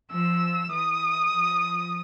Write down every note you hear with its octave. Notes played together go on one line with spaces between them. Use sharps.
F3 E6
E3 D#6
F3